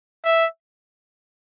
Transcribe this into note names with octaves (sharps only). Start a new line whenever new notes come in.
E5